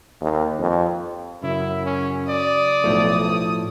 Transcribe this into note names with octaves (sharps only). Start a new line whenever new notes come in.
D#2
F2
F#2 C#3 E4
C#4
D5 D#6
B1 A2 F3 A3